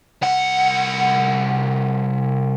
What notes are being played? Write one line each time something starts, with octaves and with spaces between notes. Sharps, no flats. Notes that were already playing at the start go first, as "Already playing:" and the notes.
C2 F#5